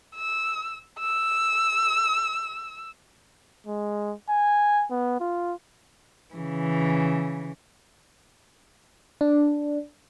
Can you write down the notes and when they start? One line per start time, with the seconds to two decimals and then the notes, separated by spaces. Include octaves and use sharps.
0.15 E6
0.99 E6
3.67 G#3
4.30 G#5
4.91 B3
5.21 F4
6.34 C#3 E3
9.21 D4